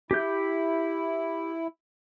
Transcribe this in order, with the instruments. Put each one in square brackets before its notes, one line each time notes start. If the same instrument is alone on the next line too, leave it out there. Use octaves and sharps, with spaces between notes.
[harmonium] E4 [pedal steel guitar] G4 G6